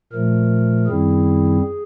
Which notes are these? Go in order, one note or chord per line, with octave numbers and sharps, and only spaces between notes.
A#2 F3 A3 A#4
F#2 D#3 G3 C4 E4 G#4